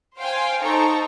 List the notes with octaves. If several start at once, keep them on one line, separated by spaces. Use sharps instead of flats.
C5 F5 G5 G#5
D#4 A4 C5 A#5 C#6